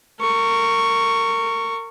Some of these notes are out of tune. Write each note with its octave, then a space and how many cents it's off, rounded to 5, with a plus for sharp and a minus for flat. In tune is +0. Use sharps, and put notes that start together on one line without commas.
A#4 -25 C#6 +0